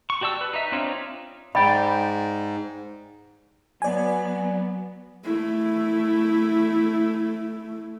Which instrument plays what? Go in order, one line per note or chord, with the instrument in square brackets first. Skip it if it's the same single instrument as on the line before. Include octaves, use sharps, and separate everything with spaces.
[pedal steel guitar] C#6
F#4 G4 D5 A5 E6
B4
D#4 E5
C4 D4 D#4 F4 C#5
[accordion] G#2 [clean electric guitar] D5 G5 [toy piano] B5
[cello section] F#3 B3 [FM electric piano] D5 G#5
[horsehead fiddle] A3 E4